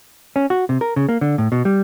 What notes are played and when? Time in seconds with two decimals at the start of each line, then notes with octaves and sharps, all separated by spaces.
0.36 C#4
0.50 F#4
0.69 C3
0.81 A#4
0.96 C#3
1.09 A#3
1.21 D3
1.38 A2
1.52 B2
1.65 G3